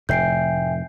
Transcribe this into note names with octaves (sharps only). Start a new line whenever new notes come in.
F1 A2 E5 G5 G#5 G6 C7 D7